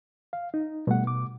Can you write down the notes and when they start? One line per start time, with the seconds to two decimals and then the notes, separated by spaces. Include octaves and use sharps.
0.33 F5
0.54 D#4
0.87 B2 G3 A3 F#5
1.07 D6